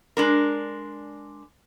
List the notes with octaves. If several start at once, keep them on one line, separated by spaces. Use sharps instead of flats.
G#3 D4 A#4